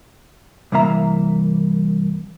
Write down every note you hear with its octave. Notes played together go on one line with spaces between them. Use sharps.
C2 G2 E3 A#3 E5 A#5